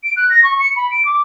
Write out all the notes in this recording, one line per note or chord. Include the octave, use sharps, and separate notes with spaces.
D7
F#6
A#6
C#6
C#7
B5
D7
D6